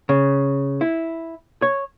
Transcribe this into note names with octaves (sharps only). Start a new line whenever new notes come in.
C#3
E4
C#5